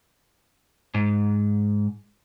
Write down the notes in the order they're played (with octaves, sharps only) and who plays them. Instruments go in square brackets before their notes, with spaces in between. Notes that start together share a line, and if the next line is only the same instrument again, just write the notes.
[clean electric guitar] G#2